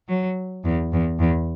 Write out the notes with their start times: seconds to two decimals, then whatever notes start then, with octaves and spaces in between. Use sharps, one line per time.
0.08 F#3
0.65 E2
0.93 E2
1.20 E2